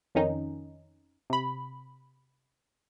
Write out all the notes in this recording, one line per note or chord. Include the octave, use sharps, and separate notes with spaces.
F2 D#3 C#4 D#4
C3 B5